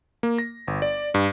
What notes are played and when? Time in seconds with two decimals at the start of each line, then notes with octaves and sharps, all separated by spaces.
0.23 A#3
0.38 A#6
0.68 G1
0.82 D5
1.14 G2